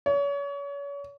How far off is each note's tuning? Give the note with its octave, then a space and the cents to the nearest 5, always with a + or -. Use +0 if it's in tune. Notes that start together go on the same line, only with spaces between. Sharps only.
C#5 +35